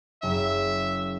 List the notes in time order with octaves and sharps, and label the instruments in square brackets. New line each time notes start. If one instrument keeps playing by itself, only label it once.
[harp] F#1 [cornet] E5